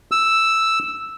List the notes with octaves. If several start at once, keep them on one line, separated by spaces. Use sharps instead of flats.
E6